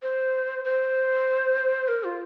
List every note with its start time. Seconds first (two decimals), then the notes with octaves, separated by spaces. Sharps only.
0.02 C5
0.65 C5
1.88 A#4
2.04 F4